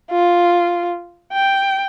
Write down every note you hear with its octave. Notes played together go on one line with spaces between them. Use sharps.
F4
G5